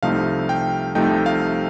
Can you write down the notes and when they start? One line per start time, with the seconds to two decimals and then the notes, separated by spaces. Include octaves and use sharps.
0.03 C2 C3 F3 A3 D#4 F5
0.49 G5
0.95 C2 C3 F3 A3 D#4 G5
1.26 F5